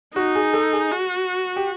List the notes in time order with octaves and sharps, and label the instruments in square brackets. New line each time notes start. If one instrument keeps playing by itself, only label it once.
[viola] D#4 [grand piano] F#4
[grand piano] G#4
A4
G#4
[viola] F#4
[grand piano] G4